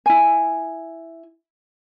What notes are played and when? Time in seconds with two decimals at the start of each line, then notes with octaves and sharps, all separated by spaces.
0.06 E4 G#5